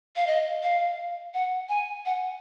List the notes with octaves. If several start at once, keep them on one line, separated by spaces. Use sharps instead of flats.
F5
D#5
F5
F#5
G#5
F#5